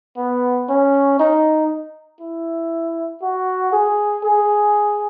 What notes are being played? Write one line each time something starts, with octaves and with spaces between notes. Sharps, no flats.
B3
C#4
D#4
E4
F#4
G#4
G#4